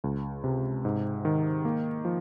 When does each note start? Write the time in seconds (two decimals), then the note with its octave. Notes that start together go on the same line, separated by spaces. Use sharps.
0.04 C#2
0.44 C3
0.85 G#2
1.25 D#3
1.65 A#3
2.05 F3